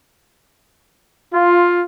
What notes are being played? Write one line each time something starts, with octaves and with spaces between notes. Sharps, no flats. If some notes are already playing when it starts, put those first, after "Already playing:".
F4